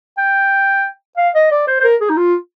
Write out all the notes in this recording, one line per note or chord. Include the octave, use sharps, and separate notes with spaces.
G5
F5
D#5
D5
C5
C5
A#4
G#4
D#4
F4